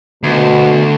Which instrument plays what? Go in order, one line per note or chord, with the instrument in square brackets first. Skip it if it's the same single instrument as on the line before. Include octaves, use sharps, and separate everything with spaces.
[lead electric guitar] D2 [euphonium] B2